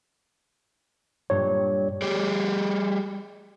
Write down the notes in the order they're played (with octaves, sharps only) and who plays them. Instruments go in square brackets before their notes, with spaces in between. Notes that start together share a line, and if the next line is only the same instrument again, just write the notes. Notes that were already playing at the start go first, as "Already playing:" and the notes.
[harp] G2 A#2 G3 [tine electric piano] C#5
[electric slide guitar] G3 G4 G#4